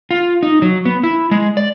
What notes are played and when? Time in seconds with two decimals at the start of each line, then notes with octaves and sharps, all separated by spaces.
0.11 F4
0.43 D#4
0.62 F#3
0.85 B3
1.03 E4
1.31 G#3
1.57 D5